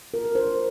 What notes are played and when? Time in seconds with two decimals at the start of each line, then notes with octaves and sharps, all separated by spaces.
0.14 F4 A#4
0.35 D4 C5